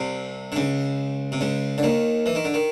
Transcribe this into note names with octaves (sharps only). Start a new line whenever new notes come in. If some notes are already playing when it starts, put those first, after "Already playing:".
Already playing: C2 C3
D3
C#2 C#3
C3
C#2 C#3
D3
D#2 D#3
E3
D#3
D3
D#3